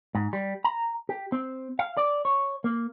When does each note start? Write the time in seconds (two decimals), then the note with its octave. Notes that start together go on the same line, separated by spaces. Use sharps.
0.15 G#2
0.33 G3
0.64 A#5
1.09 G4
1.32 C4
1.79 F5
1.97 D5
2.25 C#5
2.64 A#3